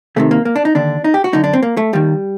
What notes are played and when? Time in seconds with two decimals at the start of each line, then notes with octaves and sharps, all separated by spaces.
0.16 C2 C3 D#3 A3
0.31 A#3
0.45 A#3
0.56 D4
0.65 D#4
0.75 D#2 D3 D4
1.04 D#4
1.14 G4
1.24 F#4
1.33 F#2 D3 D#4
1.44 D4
1.53 C4
1.63 A#3
1.77 A3
1.93 D#2 D#3 G3